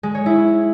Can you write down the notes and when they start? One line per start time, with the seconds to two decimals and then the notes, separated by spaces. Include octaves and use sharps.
0.03 G#3
0.15 C#5
0.26 E4